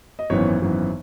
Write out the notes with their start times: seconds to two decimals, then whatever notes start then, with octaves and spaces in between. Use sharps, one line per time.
0.19 D#5
0.30 G#1 F#2 E3 B3 C#5
0.62 G#1 F#2 E3 B3